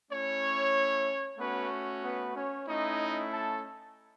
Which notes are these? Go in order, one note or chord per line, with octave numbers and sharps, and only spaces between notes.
A3 C#4 E4 C#5
A3 B3 C#4 F#4 B4
B3 B4
C#4 C#5
A3 C#4 D#4 E4 D#5
A4 A5